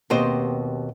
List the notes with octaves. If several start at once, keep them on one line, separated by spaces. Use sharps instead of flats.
D#2 B2 C4 G4 C5 D#5